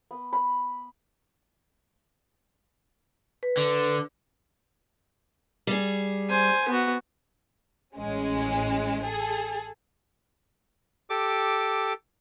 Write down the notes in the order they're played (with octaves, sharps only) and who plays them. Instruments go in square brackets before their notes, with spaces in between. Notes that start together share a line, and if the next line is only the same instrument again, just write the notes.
[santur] B3
B5
[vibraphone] B4
[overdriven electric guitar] D3
[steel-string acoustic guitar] G3 G#4
[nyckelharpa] C5 G#5
B3 F#4
[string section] A1 G#3 C#4
G#4 A4
[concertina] G4 A4 D6